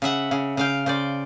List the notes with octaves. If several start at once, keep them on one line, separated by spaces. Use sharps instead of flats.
C#3 E5 F#5
C#3
C#3 F5 G5
C#3 C5 D5